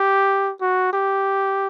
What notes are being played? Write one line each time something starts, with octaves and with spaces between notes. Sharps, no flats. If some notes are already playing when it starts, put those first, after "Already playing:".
Already playing: G4
F#4
G4